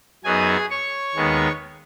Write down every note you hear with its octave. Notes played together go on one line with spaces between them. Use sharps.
F#2 F#3 B3 D#4 G#4 G#5
C#5 C#6
D#2 D#3 G#3 B3